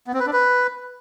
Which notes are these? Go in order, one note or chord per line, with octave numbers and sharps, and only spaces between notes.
B3
C4
B4
D4
B4